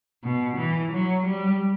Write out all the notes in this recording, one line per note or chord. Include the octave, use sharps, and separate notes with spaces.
B2
E3
F#3
G3